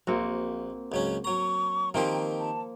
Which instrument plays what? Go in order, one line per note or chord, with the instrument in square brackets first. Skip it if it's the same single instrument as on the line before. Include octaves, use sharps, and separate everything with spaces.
[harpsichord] A#1 [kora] A#3 C4 F#4
[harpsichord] C#2 F#3 C#4
[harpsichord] F#3 A#5 [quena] C#6
[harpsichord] D#3 C4 G4 [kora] F3 A#3 [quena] G5
[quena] A5